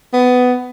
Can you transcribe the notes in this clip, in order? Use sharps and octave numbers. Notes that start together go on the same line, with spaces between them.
B3